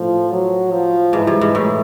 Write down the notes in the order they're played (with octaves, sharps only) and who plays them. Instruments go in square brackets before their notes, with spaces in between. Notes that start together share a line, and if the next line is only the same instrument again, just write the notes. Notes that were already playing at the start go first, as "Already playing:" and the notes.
Already playing: [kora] A2 [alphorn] F3
[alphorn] F#3
F3
[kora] G#2 [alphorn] E3
[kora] G2
G#2
A2